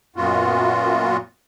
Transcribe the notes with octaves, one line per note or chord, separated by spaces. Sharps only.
F#2 A#2 B3 F4 F#4